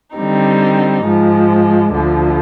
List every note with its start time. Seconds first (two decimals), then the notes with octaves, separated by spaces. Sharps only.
0.16 D3 G3 C4 D#4
1.04 G#2 F3 G#3
1.94 D2 D3 F3